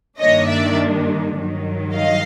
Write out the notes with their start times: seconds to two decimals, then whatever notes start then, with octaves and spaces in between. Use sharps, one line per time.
0.20 G2 D#3 G3 A#3 D4 C#5 D#5
0.48 D5 E5
1.36 G2 D#3 F#3
1.94 D#5 F5